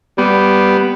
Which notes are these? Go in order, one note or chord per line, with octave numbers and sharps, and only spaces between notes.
G3 B3